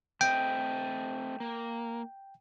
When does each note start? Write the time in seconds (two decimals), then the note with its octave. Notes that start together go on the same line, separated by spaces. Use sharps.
0.21 A3 C4 D#5 G5
1.40 A#3